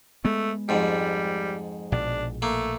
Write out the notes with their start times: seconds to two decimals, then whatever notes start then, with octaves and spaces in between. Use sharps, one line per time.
0.25 G#3 A3 B3
0.69 F2 G#2 G3
1.92 A#1 B2 D4
2.42 A3 A#3